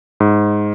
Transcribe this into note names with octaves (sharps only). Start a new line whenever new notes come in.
G#2